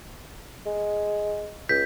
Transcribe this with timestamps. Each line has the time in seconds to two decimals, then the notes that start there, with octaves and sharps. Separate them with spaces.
0.66 G#3
1.69 C#2 G6 B6